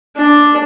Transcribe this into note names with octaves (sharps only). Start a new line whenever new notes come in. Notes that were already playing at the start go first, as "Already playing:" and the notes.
D4